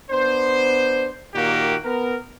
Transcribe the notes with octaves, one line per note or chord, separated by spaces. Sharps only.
B3 D4 C5
A#2 D#3 A#3 F#4 G4
B3 A#4